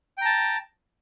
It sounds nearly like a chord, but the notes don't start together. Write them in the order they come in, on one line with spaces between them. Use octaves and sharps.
G5 A#5 A5